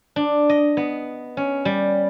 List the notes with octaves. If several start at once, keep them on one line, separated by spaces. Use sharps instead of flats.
D4
D#5
B3
C#4
G3